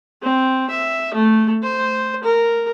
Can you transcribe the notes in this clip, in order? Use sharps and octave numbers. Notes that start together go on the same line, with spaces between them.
C4
E5
A3
C5
A#4